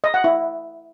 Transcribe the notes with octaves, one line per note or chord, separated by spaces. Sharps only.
D#5
F#5
E4